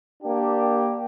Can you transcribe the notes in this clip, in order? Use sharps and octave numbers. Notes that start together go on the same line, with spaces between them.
A#3 D4 G4